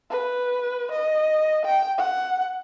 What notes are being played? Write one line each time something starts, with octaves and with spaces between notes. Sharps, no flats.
B4
D#5
G5
F#5